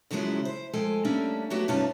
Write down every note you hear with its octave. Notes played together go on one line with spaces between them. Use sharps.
F#2 C#3 F3 F#3 G#3 E4
C5
F3 G#3 A4 G5 G#5
G3 A3 A#3 C#4 D4
F#3 A3 B3 F#4 G4
G2 C3 C#4 D#4 F4 A5